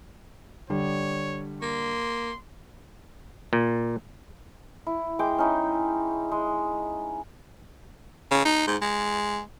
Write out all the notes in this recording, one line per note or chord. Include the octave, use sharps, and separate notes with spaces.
D3 G3 C#5
A#3 C6
A#2
E4
G#3 G5 D6
C#4 D#4 E4
G#3
C#3
D#4
G#2
G#3